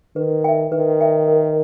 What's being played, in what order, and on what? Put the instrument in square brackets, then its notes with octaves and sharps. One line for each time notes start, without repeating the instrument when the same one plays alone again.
[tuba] D#3 [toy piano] B4
[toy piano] E5 G5
[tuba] D#3 [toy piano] B4
[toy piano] E5 G5
A#4